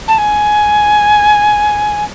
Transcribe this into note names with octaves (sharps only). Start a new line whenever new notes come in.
A5
G#5